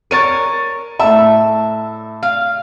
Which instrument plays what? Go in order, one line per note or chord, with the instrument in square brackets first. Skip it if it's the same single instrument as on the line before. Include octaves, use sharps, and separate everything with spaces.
[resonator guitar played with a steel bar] A#4 C#5 [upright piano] A6 D#7
[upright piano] A2 A5 [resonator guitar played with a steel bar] E5
[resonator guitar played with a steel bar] F5